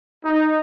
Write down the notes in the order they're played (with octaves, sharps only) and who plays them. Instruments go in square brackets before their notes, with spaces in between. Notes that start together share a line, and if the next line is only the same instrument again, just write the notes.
[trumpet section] D#4